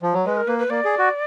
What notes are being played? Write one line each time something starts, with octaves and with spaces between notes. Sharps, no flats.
F3
F#3
G#3 B4
A#4
A#3 B4
B4
A#3 D5
G#4
F#4